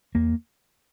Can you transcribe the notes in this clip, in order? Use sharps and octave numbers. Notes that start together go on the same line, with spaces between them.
E2 A#3